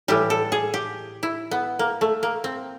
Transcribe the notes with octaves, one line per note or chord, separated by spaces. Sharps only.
A2 E3 G3 G4
A4
G#4
G4
E4
B3
A#3
A3
A#3
C4